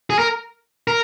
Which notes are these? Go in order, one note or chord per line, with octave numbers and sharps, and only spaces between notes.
G#4
A#4
A#4